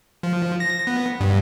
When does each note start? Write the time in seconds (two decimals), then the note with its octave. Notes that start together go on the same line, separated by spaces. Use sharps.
0.23 F3
0.60 A#6
0.87 B3
1.20 G2